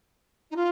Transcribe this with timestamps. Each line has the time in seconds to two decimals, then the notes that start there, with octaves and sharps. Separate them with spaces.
0.50 D#4
0.56 F4